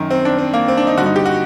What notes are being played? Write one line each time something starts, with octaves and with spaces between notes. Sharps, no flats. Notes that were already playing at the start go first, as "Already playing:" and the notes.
Already playing: F#2 D#3
C4
D4
C4
A#3
C4
D4
D#4
G2 D3 F#4
D#4
G4
F#4